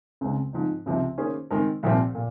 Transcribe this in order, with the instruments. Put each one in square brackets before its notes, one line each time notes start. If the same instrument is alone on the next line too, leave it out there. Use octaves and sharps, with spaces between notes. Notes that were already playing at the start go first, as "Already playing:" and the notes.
[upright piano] C#2 C#3 G#3 C4
G#2 F3 C4 D#4
C#2 C3 F3 C4
D#3 A#3 C#4 G#4 C5
D#3 G#3 C4 D#4 A#4
C2 A#2 F3 C4 F4
A#2